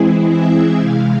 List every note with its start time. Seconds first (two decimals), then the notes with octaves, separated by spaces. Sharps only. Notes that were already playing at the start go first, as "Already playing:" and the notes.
Already playing: E3 G#3 C4 E4 G#4
0.28 E5
0.78 C3 E3 G#3 F5